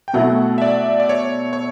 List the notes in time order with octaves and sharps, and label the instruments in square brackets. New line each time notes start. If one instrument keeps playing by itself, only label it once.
[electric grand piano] G5
[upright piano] B2 F#3 A3 E4 [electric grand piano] F#5
[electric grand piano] E5
D5
D5
C#5
C#5